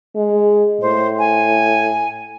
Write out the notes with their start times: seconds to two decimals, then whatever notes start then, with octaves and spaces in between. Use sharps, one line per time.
0.16 G#3
0.81 A2 C5
1.18 G#5